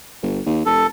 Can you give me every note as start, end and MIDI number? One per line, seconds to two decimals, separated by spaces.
0.23 0.40 31
0.46 0.63 39
0.66 0.85 29
0.66 0.87 69